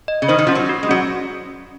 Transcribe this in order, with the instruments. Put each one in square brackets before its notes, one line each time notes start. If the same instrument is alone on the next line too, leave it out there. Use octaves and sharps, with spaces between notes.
[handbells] D#5
[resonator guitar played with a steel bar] C#3
[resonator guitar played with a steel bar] D#3 [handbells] C5
[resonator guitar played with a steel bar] D#3
[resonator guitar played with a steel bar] F3 [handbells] C#4
[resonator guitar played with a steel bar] F#3
[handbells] F#4
[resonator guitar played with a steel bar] G#3
[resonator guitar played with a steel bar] F#3 [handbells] C#4